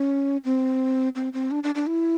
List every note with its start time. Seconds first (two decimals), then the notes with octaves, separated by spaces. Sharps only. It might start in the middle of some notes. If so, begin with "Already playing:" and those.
Already playing: C#4
0.45 C4
1.15 C4
1.33 C4
1.51 D4
1.63 D4
1.75 D4
1.87 E4